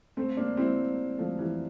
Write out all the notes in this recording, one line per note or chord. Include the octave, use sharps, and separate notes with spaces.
A3 C4
A#3 D4
C4 E4
F3 A3
E3 G3